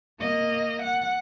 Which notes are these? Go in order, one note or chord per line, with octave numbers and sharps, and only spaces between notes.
A#3 D#5
F#5